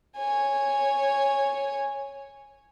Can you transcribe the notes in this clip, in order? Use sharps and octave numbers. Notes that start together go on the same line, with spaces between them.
C#5 G#5